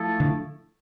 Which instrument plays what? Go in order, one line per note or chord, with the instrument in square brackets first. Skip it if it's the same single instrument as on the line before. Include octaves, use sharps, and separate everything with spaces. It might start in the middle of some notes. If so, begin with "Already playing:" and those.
Already playing: [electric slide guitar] F3 A3 E4 A4
[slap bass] D3